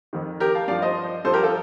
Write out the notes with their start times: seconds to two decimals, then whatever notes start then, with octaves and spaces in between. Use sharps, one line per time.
0.13 F2 D#3
0.40 G4 A#4
0.54 F5 A5
0.68 G2 F3 D5 F5
0.82 C5 D#5
1.25 G2 F3 A4 C5
1.34 G4 A#4
1.43 F4 A4